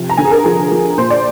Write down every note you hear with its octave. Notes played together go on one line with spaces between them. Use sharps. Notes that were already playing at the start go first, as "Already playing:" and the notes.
Already playing: C3 F3
A#5
D3 G#5
G#4
A#4
F3 G#4
F3
A#2 C5
D5